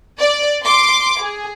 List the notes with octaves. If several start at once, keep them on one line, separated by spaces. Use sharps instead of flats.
D5
C6 D6
G#4